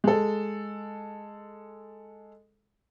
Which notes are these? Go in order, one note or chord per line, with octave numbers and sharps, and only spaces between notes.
G#3 A4